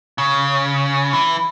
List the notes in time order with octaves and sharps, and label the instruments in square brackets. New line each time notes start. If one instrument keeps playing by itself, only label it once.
[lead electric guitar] C#3
E3